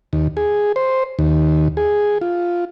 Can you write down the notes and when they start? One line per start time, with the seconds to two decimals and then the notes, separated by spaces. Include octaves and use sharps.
0.13 D#2
0.37 G#4
0.76 C5
1.19 D#2
1.77 G#4
2.21 F4